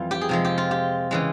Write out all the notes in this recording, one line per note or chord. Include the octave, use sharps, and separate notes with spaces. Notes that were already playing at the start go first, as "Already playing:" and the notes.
Already playing: F2 E3 G3 F4
G4
G#4
C3 F3 G#3
G4
F4
G4
C#3 E3 G#3